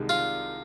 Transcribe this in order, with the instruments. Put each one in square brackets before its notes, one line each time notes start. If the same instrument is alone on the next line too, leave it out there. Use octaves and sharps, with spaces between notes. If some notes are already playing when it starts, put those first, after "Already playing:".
Already playing: [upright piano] C2 C3 D#3 G#3
[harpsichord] F4